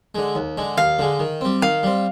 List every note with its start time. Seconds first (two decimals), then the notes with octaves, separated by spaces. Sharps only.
0.15 D3 G#3
0.35 D#2
0.58 D3 G#3
0.77 D#2 F5
0.99 D3 G#3
1.20 D#3
1.41 G3 C4
1.62 D#3 F5
1.83 G3 C4